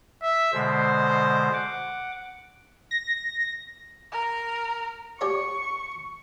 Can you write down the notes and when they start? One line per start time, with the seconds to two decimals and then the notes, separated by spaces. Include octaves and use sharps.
0.22 E5
0.53 B2 D3 G#3 C5
1.54 F#5 D6
2.91 A#6
4.12 A#4
5.21 G4 C#5 D5 C#6